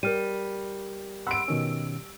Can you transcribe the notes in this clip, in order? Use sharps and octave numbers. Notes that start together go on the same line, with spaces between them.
G3 A#4 F6 D#7
F#5 B5 C6 E6 D7
B2 D#3 C#4